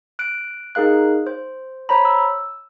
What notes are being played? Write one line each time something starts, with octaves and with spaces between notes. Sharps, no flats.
F#6 D7
D#4 G#4 A#4 F5 F#6
C5
C5 C#5 A#5 B5
E6